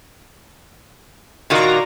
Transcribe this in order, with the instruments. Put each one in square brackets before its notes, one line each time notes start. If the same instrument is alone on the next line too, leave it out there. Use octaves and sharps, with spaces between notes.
[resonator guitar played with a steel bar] A#2 D#3 A#3 [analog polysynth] F#4 D5 A#5